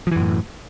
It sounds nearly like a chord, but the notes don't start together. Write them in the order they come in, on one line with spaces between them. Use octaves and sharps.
F3 E3 F#2 A2